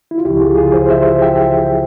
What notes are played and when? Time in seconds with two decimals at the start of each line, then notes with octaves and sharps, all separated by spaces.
0.11 E4
0.18 F4
0.25 C#2 C#3 F3 E4 G4
0.41 F4 G#4
0.57 F4 G#4
0.74 G#4 C5
0.90 C5 E5
1.22 E5 G5